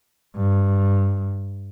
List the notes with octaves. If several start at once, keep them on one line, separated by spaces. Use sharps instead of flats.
G2